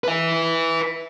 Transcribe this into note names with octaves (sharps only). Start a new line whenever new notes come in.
B4 E5